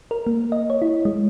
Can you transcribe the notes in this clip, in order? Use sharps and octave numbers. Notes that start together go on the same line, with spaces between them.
A#4
A#3
D#5
C#5
E4
G#3